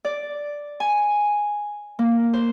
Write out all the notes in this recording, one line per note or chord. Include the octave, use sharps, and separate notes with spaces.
D5
G#5
A#3
C5